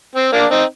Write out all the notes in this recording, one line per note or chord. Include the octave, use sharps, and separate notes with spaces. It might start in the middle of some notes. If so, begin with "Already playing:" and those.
C4
A#3 D4
C4 D#4